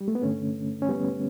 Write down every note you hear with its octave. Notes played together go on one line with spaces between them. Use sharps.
G3
A3
B3
G2 D3 A3 C#4
C#4
G3 B3